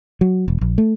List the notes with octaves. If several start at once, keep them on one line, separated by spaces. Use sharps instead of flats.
F#3
E1
A#1
A3